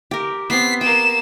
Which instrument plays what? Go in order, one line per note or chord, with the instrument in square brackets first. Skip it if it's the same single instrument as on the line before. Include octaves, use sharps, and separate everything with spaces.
[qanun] G4 A#4
[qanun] B3 C4 [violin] B6 C7
[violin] A#3 E7 [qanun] G5